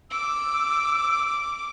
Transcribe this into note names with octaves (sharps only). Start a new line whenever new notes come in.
D6 E6